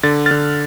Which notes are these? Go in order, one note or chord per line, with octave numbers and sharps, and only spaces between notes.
D3 A6
D3 F6 A6